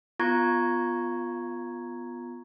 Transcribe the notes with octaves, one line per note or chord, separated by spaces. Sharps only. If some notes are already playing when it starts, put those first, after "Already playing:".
B3 F4 A#5 C#6 G#6